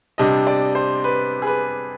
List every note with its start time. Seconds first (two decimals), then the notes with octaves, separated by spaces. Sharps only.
0.18 C3 G3 D4 D#5
0.47 D5
0.75 C5
1.04 B4
1.42 G#4
1.47 B4